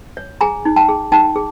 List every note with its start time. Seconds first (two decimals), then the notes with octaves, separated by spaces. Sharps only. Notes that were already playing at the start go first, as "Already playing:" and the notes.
0.17 C#5
0.41 G#4 G#5 A#5
0.65 D#4
0.76 G5 A5
0.89 G#4
1.12 D#4 G5 A5
1.36 G#4